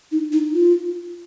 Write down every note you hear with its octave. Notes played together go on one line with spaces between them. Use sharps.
D#4
D#4
F4